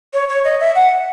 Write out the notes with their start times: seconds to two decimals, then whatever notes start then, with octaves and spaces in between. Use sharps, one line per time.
0.14 C#5
0.29 C#5
0.45 D#5
0.60 E5
0.75 F#5